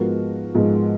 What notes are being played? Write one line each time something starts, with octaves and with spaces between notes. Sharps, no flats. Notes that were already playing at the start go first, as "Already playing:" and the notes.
Already playing: G#2 F3 G#3 B3 F#4 A#4
G#2 F3 G#3 B3